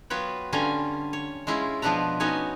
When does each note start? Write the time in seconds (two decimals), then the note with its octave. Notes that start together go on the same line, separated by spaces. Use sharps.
0.10 F#3 B3 F4 B4 C#5 G5
0.53 D3 G3 C#4 F4 G#5 A#5
1.13 C#5
1.47 G#3 C#4 E4 F4
1.82 B2 F3 B3 D4 B4 A#5
2.20 B3 C#4 D#4 F#4 C#5 G#5